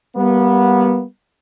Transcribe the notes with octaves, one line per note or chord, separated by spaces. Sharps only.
G3 A#3 B3